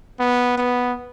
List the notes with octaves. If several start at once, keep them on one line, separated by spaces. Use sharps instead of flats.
B3
B3